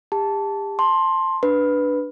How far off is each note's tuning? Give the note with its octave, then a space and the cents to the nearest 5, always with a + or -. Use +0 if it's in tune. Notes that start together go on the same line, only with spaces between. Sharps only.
G4 +35 A5 +0
A5 +10 C6 +15
D4 +0 B4 +0